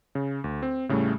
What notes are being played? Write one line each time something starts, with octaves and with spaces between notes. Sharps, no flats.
C#3
D2
C4
A2 C#3 G3 A3